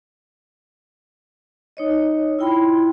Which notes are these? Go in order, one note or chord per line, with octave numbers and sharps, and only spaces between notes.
D#4 C#5 D#5
E4 F4 G5 B5 C6